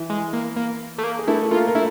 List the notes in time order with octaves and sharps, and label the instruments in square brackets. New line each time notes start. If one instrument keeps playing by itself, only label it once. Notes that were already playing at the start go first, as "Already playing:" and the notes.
Already playing: [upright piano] E3 E4
[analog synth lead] G#3
A#3
A#3
A3
A#3
[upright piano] G#4
[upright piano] A3 A4 [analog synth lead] E4
[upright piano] A4
[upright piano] A#3 A#4 [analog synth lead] F4
[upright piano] A#4
[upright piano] A3 A4 [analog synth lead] E4